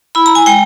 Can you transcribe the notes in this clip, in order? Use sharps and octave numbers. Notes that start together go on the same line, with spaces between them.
E4 B5
A#5
G#5
G#3 G5